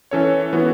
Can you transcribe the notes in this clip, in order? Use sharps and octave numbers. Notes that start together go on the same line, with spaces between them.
E3 C#4 A4 C#5
E3 B3 F#4